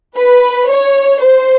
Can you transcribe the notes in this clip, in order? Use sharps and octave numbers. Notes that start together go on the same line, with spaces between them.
B4
C#5
C5